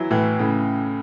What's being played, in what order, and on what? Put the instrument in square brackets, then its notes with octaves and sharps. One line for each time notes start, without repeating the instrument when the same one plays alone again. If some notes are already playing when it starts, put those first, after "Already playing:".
Already playing: [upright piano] E3 F#3 [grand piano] E4
[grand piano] A2 [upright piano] E3
[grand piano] A2 [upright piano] C#3